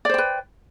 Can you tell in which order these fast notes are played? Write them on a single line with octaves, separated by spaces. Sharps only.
D5 C5 G5 B4